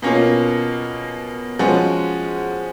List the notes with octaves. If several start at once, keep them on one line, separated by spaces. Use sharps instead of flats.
B2 A#3 C#4 F4
F3 G#3 C#4 F#4